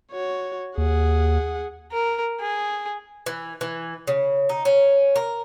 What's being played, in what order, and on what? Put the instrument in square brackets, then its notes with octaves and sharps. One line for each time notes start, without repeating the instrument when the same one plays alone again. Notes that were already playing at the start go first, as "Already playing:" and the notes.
[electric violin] F#4 C#5
[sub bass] D#2 [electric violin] G#4 F#5
[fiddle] A#4
G#4
[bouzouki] E3
E3
C#3
D#4
C#4
A#4